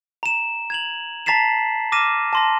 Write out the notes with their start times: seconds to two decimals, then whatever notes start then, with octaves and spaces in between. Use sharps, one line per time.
0.23 A#5 E7
0.70 G#6 F7 F#7
1.26 A5 A#5 A6 B6 C7 E7
1.92 D6 F6 A#6 D#7 E7
2.33 A5 C6 A#6